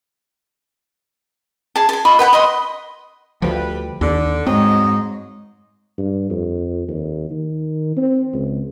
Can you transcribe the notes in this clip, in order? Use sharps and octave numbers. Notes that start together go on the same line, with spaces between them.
G#4 A5
G#5 A5
F4 D#5 B5 C#6
B4 F#5 G5 B5
D#5 B5 C6
D2 F3 G3 G4 B4
D#2 D3
G#2 F#3 C4 C#5 D#5
G2
F2
D#2
D#3
C4
C#2